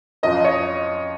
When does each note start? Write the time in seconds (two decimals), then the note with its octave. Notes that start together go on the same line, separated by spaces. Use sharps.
0.23 F2 F3 C#4 D#5
0.44 C#5